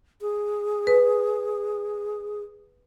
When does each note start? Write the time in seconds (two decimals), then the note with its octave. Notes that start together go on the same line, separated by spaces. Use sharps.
0.21 G#4
0.87 B4